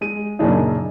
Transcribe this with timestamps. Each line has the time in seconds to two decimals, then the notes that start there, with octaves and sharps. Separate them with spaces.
0.01 G#3 D#7
0.39 F#2 A#2 C#3 D4 D#4